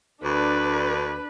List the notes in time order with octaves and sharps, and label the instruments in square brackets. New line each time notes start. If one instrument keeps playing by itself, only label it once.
[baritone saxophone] D2 [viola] D4 B4